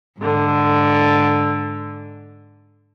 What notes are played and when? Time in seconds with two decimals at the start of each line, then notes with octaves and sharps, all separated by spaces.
0.19 G#2 D3